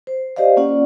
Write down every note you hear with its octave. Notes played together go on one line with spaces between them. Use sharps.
C5
G4 C5 D5 D#5 F5
A#3 C#4 F4 D5 F#5